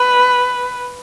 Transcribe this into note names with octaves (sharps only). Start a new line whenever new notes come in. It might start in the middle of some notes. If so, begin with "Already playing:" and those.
Already playing: B4